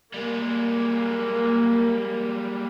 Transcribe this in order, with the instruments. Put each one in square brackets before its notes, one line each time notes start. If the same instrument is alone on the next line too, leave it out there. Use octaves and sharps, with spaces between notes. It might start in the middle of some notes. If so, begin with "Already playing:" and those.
[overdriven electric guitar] G3 G#3 [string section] A#3